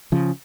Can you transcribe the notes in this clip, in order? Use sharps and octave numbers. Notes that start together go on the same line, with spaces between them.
C#3 F3